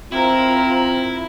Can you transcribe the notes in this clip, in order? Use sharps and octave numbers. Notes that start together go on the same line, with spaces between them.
C4 E4 F4 A#4 C5 A#5